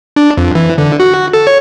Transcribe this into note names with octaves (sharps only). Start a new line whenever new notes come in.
D4
F2
E3
D3
F#4
A4
C#5